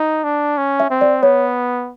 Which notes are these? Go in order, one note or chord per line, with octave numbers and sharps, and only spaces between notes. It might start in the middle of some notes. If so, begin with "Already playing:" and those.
Already playing: D#4
D4
C#4
E5
C4
D5
B3 C#5